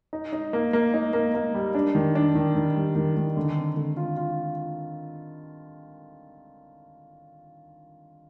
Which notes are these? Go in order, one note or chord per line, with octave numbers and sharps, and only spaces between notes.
D#4
D#4
A#3
A#3
D#4
A#3
A#3
G3
D4
D#3
D4
D#3
D#3
G3
D#3
D#3
D3
C4
D3
F4
F4